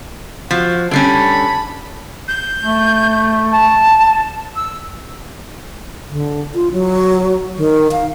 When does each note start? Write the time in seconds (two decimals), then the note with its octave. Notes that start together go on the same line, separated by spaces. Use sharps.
0.51 F3 F#4
0.91 D3 G3 C#4 A5 B5
2.28 G6
2.62 A3
3.52 A5
4.56 E6
6.10 D3
6.55 F4
6.72 F#3
7.57 D#3
7.92 F5